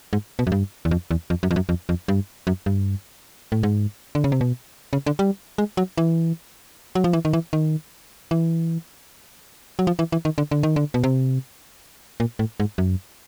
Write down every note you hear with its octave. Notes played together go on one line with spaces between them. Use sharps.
G#2
B2
F#2
G2
E2
F2
E2
F2
F#2
F2
F#2
F2
F2
G2
F#2
G2
A2
G#2
D3
C#3
C3
B2
C#3
D3
G3
G#3
F#3
E3
F#3
F3
E3
D#3
E3
D#3
E3
F#3
F3
E3
E3
D#3
D3
D3
D#3
D3
B2
C3
A#2
A2
G#2
F#2